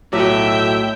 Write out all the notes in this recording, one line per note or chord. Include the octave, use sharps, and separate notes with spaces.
B1 A2 F#3 F4 C#5 E5 G5 D6